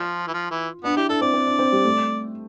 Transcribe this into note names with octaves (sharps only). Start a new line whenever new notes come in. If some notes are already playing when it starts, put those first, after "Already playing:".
Already playing: F3 F4
E3
F3
E3
B3 D4
E4 G4
D4 A4
C4 D5
C4
D4
C4
G3
A3